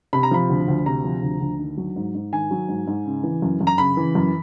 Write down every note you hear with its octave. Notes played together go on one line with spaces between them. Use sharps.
C3 B5
A#5
F3 B5
D2
D2
C3 A#5
F3
D2
D2
D#3
F#3
G#2
G#2
D#3 G#5
F#3
G#2
G#2
C#3
E3
F#2
F#2
A#5
C#3 B5
E3
F#2